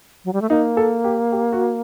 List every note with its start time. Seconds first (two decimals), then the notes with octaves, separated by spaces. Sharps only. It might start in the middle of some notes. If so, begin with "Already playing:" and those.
0.25 F#3
0.33 G3
0.42 A3
0.50 A#3 D#4
0.77 A4
1.04 G4
1.32 G4
1.53 F#4